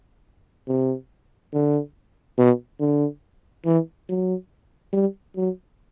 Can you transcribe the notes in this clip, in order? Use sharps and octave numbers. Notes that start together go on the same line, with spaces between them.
C3
D3
B2
D3
E3
F#3
G3
F#3